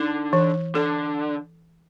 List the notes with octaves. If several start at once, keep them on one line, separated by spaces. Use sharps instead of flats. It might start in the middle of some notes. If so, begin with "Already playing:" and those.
Already playing: D3 D#4
E3
D3 A4